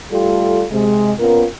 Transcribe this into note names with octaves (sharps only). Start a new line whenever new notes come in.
G3 A3 F4 G4 A4
C3 G#3
A#2 B3 C#4 F4 A#4